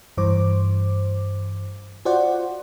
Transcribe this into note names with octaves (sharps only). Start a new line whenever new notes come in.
G2 E3 C5 D6
F4 F#4 C5 D5 F#5